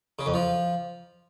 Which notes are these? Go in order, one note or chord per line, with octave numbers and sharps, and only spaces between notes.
C#3
F2
F3